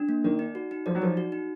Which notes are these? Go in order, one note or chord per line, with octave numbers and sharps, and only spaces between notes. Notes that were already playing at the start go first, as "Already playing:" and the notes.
Already playing: D4
A#3
D#3 D5
D#4
F#4
D#4
F3 D5
F#3
F3 D#4
F#4
D#4